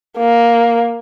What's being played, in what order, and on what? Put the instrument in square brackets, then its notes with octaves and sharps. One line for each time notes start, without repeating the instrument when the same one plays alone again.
[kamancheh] A#3